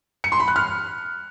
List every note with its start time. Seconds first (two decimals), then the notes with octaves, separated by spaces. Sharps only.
0.24 C#7
0.32 C6
0.40 B5
0.48 F#6
0.56 F6